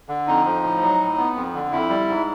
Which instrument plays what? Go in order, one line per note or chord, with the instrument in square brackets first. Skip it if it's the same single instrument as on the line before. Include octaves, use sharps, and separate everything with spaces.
[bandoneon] D3
F2 D#4
F3
A2
F#3
A2
B3
F2
D3
F2 E4
G3
G#2